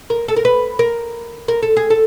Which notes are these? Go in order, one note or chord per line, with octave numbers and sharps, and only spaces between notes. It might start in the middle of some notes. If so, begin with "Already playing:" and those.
A#4
A4
A#4
B4
A#4
A#4
A4
G#4
A4